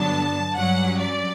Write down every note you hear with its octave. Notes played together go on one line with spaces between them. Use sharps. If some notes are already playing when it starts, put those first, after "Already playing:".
Already playing: G2 D3 F#3 B3 D4 A5
G2 F#3 C#4 F#5
D5